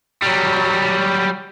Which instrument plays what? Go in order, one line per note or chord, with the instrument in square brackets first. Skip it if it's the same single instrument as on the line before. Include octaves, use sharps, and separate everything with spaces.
[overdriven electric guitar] F#3 G3